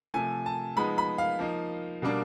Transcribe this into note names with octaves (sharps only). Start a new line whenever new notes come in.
C3 F3 A3 G#5
A5
F3 G#3 B3 D#4 B5
B5
F5
F3 A#3 D#4
B2 G3 A#3 D4